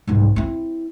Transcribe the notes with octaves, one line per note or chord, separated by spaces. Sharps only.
C2 G#2
C4 E4